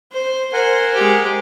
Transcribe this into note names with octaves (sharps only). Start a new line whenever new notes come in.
C5
A#4 C5 F#5 G#5
G#3 G4